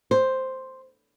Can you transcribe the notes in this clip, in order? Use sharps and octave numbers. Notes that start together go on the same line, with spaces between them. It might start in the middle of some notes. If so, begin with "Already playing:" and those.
C5